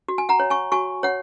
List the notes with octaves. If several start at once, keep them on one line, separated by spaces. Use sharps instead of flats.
F#4
G#5
F#5 A#5
C#5
G#5 C#6
F#4 G#5 C#6
C#5 F#5